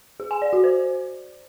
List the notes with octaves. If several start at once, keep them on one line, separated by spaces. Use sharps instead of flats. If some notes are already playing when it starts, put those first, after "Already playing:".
G#4
G#5
D5
F#4
C5